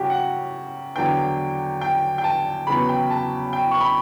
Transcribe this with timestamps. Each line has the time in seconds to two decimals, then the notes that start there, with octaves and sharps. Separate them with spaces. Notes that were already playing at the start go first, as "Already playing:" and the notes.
Already playing: F#2 C#3 G3 F#4 G4
0.10 F#5
0.96 E2 D3 F#3 G5
1.81 G5
2.18 G5
2.24 A5
2.67 E2 C#3 F#3 B3 B5
2.89 G5
3.10 A5
3.53 G5
3.71 C#6
3.80 B5